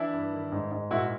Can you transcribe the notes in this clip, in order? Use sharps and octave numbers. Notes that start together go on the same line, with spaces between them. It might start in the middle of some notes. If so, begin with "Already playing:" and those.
Already playing: E3 D4 E4
G2
D#3
G#2
G#2
A#2 E4 F#4